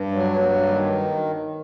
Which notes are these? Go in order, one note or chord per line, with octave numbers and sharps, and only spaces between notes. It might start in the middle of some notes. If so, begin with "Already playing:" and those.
Already playing: G2
F#3
G2 A#3
D#3 A#3